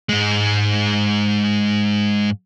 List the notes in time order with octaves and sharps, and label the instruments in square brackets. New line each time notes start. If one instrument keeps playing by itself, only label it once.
[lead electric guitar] G#2 G#3